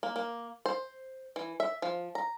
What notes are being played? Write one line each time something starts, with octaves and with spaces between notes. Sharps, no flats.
A#3
A#3
C5
E3
E5
F3
A#5